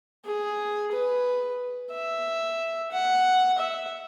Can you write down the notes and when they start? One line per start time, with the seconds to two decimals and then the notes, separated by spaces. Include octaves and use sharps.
0.25 G#4
0.92 B4
1.91 E5
2.92 F#5
3.58 E5